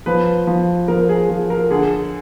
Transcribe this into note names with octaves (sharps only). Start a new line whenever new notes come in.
F3 B4
F3
F3 A#4
G#4
F3 G#4
A#4
D3 G#4